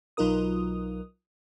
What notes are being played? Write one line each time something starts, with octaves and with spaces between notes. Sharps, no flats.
B1 F#3 D#4 F4 A#4 D#6